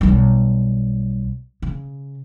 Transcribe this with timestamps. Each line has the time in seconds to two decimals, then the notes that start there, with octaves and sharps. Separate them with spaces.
0.01 B1 G3
1.62 C#3